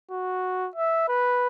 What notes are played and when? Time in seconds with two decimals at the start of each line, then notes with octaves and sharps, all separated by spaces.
0.11 F#4
0.76 E5
1.08 B4